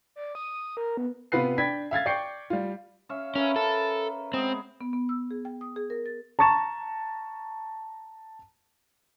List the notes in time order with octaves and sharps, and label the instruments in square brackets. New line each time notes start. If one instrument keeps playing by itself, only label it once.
[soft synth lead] D5
D#6
A#4
B3
[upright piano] C3 B3 F4 B4 F#6 C7
D4 G5 B5 G#6 B6
E5 F5 G#6 A6
D5 G5 C#6 G6 C7 C#7
G3 F4
[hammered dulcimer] C#4 E5 F5
[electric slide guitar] C#4 [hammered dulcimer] A#4 B4 E5
[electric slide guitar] A4
[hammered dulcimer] G#3 B3 [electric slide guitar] C4
[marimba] B3
B3
E6
G#4
G5
D#6
G#4
A#4
A6
[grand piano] A5 A#5 C#6 A6 E7